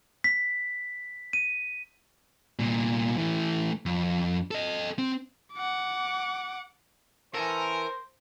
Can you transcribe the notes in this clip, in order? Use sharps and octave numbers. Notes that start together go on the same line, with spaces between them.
B6
D#7
C2 A#2
E3 A3
F2
A4 D#5
C4
F#5 D6
E3 C#4 A4 A#4 C5